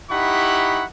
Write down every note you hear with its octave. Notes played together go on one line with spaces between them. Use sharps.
D#4 E4 G4 F#5 B5 C#6